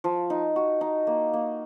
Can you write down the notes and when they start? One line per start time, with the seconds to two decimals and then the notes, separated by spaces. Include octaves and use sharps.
0.04 F3
0.30 D#4
0.56 F#4
0.81 D#4
1.07 A#3
1.33 A#3